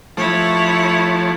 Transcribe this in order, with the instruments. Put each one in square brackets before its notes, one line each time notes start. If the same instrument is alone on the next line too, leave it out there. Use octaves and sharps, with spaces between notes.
[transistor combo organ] F3 A3 [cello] E4 C#5